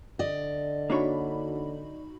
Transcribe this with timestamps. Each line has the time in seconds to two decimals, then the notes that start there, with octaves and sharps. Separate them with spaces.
0.19 D3 D5 D#5
0.90 A#3 D4 D#4 F#4 C#5 B5